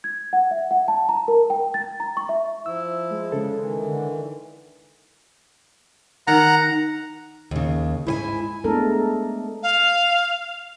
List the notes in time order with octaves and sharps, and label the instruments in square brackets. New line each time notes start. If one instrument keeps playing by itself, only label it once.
[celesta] G#6
F#5
E5
F#5
A5
A#5
A#4
G5
A6
A#5
C#6
E5
[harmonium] F3 E4 [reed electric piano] E6
[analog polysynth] G#3
[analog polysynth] C#3 G#3 [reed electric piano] A4
[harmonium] D#3 E3
[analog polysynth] D3
[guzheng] D#3 A#4 [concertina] F#5 A#5
[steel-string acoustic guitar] D#2 C#3
[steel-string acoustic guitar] G#2 C5 G#5 [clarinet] E4
[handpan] G#3 A3 B3 D4 A4 A#4
[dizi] F5